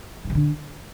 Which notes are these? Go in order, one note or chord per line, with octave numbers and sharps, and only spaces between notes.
A2
C3
D3